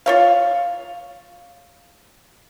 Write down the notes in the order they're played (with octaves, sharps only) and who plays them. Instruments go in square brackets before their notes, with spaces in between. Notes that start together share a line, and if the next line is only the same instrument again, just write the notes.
[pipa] F4 C#5 F5